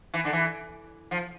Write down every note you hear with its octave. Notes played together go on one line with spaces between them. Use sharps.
E3
D3
E3
F3